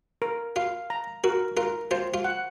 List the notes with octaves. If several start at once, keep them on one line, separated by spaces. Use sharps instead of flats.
A#4
F4 F5
A#5
F#4 A#4
F4 A#4
F4 C5
F4
F#5